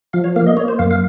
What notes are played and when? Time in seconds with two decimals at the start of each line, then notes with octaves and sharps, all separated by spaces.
0.13 F3 F5
0.24 C#5
0.36 A#3 F5
0.47 D#5
0.57 A#3 C#5
0.68 C5
0.79 F#2 F5
0.91 F5